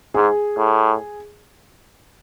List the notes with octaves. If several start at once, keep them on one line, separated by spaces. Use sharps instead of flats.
G#2 G#4
A2